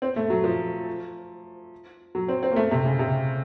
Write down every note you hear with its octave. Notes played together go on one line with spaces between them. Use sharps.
C4
A3
F#3
F3
F#3
C4
C4
A#3
A3
C3
C#3
C3